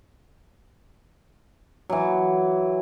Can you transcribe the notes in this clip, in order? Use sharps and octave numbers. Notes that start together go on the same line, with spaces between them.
E3 F#3